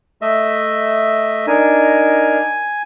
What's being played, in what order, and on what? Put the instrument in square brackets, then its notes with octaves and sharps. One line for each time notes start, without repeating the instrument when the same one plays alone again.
[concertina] A3 D#5 E5
[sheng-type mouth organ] D4 D#4 A#4 [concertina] G#5